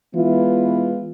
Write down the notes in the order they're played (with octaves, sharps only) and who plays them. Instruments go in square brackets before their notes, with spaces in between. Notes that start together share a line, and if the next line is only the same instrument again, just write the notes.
[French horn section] E3 G#3 B3 E4 F4